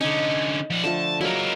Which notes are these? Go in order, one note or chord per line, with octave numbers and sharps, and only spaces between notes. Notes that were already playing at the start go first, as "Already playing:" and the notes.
D3 C#4 D#4
F3 D5
D3 F3 A3 A5
F#3 G#3 A#3 E4 A#4